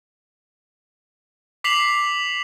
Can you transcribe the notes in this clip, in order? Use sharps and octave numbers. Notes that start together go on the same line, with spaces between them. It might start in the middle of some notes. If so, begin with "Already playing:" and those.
D6 B6 C7 F7 F#7